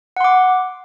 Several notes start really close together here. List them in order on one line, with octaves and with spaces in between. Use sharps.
F#5 C6 D6